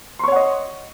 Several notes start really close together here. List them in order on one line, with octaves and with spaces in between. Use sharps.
C6 C#6 C#5 F#5 D#5